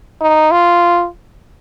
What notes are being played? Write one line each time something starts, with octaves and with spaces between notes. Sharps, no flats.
D#4
F4